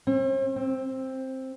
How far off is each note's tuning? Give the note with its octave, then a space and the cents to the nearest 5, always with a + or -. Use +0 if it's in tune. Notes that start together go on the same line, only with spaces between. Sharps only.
C4 +45
C4 +10